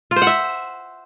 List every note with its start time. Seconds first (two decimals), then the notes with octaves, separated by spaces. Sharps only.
0.11 F4
0.16 C5
0.22 F#5
0.27 E5